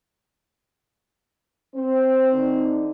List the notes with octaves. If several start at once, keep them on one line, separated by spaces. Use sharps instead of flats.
C4 C5
D3 D#4